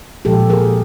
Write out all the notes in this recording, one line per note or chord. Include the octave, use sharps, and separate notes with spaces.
A#2 F3 G#3 G4 A4
G#4 A#4